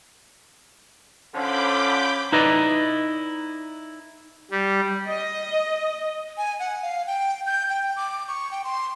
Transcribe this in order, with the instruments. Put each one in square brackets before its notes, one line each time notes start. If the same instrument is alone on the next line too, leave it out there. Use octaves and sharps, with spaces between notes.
[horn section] D3 F3 C#4 [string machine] B5 D6 G6
[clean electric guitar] D#4 E4 B4 D5 D#5
[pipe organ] G3
[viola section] D#5
[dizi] G#5
F#5
F5
G5
G6
G5
D6
C#6
G5
C6